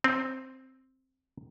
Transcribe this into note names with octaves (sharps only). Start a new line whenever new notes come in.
C4